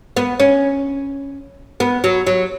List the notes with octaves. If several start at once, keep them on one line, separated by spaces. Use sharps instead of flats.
B3
C#4
B3
F#3
F#3